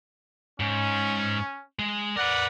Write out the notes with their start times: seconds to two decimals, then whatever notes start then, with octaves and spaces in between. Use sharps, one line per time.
0.60 G#2 C#4
1.79 G#3
2.16 A#4 B4 D5 F#5